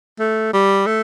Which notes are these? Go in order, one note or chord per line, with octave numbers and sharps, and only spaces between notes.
A3
G3
A3